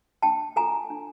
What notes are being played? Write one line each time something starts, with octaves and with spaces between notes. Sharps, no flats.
D4 G5 A5
F4 A4 G#5 A#5
D4